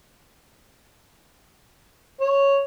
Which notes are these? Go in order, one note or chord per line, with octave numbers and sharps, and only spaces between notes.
C#5